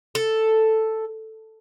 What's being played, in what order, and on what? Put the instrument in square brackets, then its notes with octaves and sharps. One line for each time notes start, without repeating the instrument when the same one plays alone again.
[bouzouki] A4